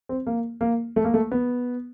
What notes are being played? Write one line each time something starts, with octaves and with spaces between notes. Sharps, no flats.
C4
A#3
A#3
A3
A#3
A3
B3